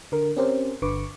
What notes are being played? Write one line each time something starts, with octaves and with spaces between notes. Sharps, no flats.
D3 A#4
C4 C#4 G4 A#4 C5
G1 D3 B4 C#6 D6